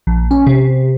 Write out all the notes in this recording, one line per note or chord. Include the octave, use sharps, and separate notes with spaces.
A#1
C#4
C3